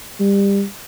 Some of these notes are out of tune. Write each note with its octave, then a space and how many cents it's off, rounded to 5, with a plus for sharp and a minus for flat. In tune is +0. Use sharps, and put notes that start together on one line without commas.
G3 +25